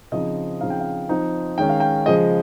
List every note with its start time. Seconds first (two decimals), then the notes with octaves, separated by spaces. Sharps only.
0.12 C#3 F3 C4 D#4 D#5
0.61 C#3 F3 C4 D#4 F5
0.70 G5
0.80 F5
1.09 F3 C4 D#4
1.58 D#3 G#3 C#4 G5
1.69 F5
1.80 G5
2.06 C#3 F3 G#3 D#5